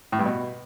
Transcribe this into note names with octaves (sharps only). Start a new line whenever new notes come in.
A2
G2
B2